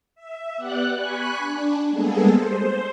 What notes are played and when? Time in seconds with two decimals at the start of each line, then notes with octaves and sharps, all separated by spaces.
0.15 E5
0.57 B3 G4 D5 F#5 F#6
0.95 G#5 B5 C#6 F#6
1.37 D4
1.89 G3 G#3 A#3 B3 G#4 A4
2.29 C5